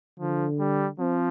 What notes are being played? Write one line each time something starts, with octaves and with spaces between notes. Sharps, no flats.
D3 F3
G3
F3 C4